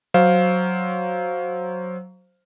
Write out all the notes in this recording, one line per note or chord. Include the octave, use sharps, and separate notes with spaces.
F#3 C5 F5